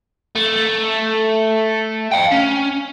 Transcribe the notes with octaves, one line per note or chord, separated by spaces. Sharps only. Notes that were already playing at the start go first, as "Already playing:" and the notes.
A3
F5 G5
C#4